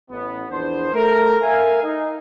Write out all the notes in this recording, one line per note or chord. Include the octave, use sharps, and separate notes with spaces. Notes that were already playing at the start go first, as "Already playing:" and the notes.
A1 B3
A#1 E2 B3 D4 C5
A3 A#4
A#4 E5 F5 G#5
D#4